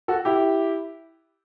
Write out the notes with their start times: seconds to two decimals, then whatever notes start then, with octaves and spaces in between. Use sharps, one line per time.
0.08 F#4 A4
0.25 E4 G4